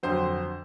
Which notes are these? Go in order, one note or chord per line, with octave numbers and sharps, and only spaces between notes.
F2 D3 F#3 C5